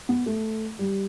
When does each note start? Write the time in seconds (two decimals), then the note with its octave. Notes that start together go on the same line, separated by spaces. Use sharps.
0.09 B3
0.26 A3
0.79 G3